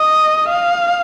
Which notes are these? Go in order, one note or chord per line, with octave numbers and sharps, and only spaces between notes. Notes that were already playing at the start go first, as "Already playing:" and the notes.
Already playing: D#5
F5